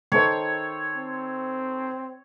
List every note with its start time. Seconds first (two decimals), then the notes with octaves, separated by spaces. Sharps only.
0.12 D#3 A4 C5 C#5
0.96 C4